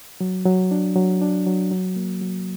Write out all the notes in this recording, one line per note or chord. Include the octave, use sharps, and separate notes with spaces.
F#3
F#3
D4
F#3
D4
F#3
F#3
A#3
F#3